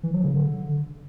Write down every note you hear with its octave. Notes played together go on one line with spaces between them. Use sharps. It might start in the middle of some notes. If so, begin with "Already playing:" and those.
E3
F#3
C#3
D3